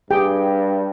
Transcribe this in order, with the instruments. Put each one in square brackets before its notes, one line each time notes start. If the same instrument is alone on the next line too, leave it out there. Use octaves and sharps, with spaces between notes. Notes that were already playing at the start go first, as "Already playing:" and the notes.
[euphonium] G2 [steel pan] G4 G#4 G5